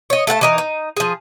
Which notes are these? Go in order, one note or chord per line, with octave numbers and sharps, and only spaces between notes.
C#5 D#5
A3 A4 F#5 A5
E3 D#4 A#4
D#4
F3 G#4